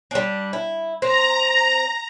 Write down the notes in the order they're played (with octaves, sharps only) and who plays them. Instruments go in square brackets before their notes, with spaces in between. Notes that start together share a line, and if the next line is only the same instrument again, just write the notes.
[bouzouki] G3 D4
E4
[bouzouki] C4 [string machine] A#5